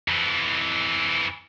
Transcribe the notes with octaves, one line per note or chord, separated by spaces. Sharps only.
F2 E3